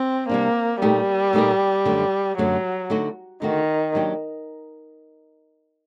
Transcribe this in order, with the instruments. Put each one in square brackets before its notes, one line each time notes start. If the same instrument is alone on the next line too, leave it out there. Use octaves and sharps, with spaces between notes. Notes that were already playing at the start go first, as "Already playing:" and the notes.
Already playing: [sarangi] C4
[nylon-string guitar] C3 G3 D4 [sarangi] A#3
[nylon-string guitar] A#2 A3 D#4 G4 A#4 [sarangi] G3
[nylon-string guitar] A#2 A3 D#4 G4 A#4
F#2 D3 A3
[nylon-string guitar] F#2 D3 A3 [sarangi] F#3
[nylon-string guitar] D3 A3 D#4 F#4
[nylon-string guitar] D3 A3 D#4 F#4 [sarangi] D#3
[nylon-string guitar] F#3 A#3 D4 G4